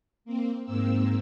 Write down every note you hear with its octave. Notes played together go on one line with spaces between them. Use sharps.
A#3 C4
G#2 A#3 C4 E6